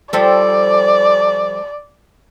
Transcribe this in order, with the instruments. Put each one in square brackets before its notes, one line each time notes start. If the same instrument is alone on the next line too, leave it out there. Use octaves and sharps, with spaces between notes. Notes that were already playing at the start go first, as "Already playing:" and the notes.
[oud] F3 G3 A4 [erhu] D5